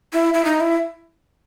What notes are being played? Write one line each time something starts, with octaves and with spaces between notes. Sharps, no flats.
E4
E4
D#4
E4